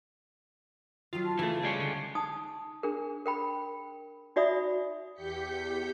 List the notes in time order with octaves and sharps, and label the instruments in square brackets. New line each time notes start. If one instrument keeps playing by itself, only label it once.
[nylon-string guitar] D#3 F#3 [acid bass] F4
[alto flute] A5
[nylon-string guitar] C#3 [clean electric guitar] E3 A3
[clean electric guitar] G3 G#3 C#4
[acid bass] D3
[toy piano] D#4 A5 D#6
D4 G#4 A#4
A#4 G5 B5
D#4 F#4 D5 E5 B5 D#6
[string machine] E2 G4 G6 B6 C#7